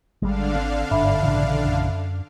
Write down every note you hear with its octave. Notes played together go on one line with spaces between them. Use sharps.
G#1 D3 G3 G#3 D4 F5
C4
G1 G#2 E5 B5
A#1 C#3 E3
F#2